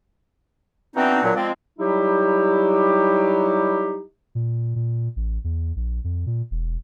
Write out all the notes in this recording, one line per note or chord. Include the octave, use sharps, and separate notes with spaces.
E3 B3 C4 D4 D#4 F#4
A#2 F#3
F3 G#3 C4 D5
F#3 G3 D#4 E4 G4
A#2
A#2
A1
E2
A#1
F2
A#2
E1